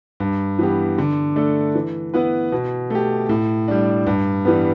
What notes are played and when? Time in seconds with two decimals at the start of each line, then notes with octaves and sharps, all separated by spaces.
0.20 G2
0.59 E3 B3 G4
0.98 D3
1.36 A3 D4 A4
1.75 E3
2.14 B3 E4 B4
2.52 B2
2.90 A3 G4
3.29 A2
3.68 G3 D4
4.06 G2
4.45 E3 G3 B3